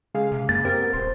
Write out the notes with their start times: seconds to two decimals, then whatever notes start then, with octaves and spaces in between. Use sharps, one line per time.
0.15 C#3 G#3 G#4 F5
0.32 C3
0.49 F#2 A#3 A6
0.65 C4 G4 A#4
0.81 B3
0.93 D#1 C5